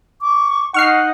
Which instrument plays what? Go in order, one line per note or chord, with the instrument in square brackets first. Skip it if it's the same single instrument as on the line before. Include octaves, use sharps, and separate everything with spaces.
[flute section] C#6 D6
[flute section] D#4 [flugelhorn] F#5 [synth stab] C#6 F6 C7